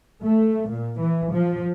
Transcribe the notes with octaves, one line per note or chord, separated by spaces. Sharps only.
A3
A#2
E3
F3